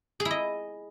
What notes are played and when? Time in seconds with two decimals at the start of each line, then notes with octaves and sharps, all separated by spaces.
0.20 G#4
0.25 E4
0.31 D#5